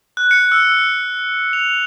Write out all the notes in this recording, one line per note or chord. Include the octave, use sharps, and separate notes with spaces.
F#6
C#7
E6
F7